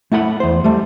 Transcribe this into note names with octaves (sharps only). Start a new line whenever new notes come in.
A3 E4 F#5 B5
E2 C5
G3 A3